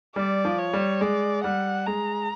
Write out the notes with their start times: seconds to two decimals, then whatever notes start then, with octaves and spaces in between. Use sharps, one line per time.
0.16 G3 D5
0.45 F3
0.58 C#5
0.73 G3
1.01 G#3 D5
1.44 G3 F#5
1.87 G#3 A#5